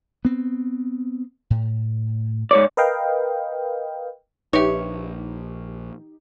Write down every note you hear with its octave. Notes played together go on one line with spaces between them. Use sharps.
B3 C4
A2
G#2 C#5 D5
A#4 B4 D#5 F5 G5
A#1 D#4 G4 B4 C#5 E5